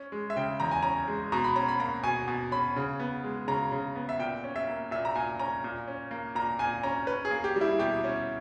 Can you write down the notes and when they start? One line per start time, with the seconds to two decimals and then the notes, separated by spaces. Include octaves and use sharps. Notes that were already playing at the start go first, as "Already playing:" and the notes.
Already playing: C#4
0.12 G#3
0.30 E5
0.36 C#3 G5
0.60 E2 A#5
0.71 G#5
0.82 C#4 A#5
1.08 G#3
1.32 B2 A#5
1.44 B5
1.56 C#4 A#5
1.68 B5
1.80 A#3 A#5
2.03 B2 G#5
2.28 B2
2.51 C#4 B5
2.76 C#3
3.00 B3
3.24 G#3
3.48 C#3 A#5
3.72 C#3
3.95 B3
4.09 E5
4.19 A#2 G5
4.44 C#4
4.56 E5
4.67 A#3
4.91 A#2 E5
5.05 A#5
5.15 A#2 G#5
5.39 C#4 A#5
5.64 A#2
5.88 C#4
6.11 A#3
6.35 A#2 A#5
6.59 A#2 G#5
6.83 C#4 A#5
7.07 C#4 B4
7.25 G#4
7.31 A#3
7.44 G4
7.56 G3
7.61 E4
7.79 B2 G4
8.04 C#4